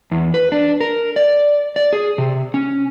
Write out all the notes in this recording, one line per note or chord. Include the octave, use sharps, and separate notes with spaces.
E2
B4
D4
A#4
D5
D5
G#4
C3
C#4